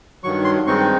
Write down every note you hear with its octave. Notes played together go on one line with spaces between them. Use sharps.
G2 D#3 F#3 C#6
C6
G2 D#3 G#3 C4 D#4 C#6